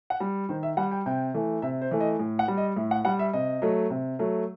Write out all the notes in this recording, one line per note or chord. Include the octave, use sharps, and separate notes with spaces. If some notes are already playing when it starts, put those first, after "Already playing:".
F#5
G3
D#3 C5
E5
G3 F#5
G5
C3 G5
E3 A3
C3 E5
C5
E3 A3
D#5
A2
F#5
G3
D#5
A2 E5
F#5
G3 F#5
E5
C3 D#5
F#3 A3
C3
F#3 A3